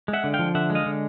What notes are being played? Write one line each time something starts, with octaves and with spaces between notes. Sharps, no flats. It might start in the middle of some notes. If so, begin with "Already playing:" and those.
G#3
E5 F#5
D3
F5 G5
F3
D3 E5 F#5
G#3
D#5 F5
D3